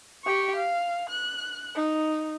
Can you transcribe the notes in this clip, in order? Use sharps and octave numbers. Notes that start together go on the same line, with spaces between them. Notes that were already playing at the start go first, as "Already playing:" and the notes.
G4 C#6
F5
F#6
D#4